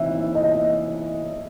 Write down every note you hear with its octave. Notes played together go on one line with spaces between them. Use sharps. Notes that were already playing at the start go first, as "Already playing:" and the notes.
Already playing: E3 C4 D#4 E5
D#5